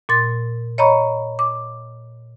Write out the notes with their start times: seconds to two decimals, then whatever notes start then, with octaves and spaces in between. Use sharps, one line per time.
0.09 A#2 C6 A6
0.78 C#5 D#5 A#5 B5 C#6
1.39 D6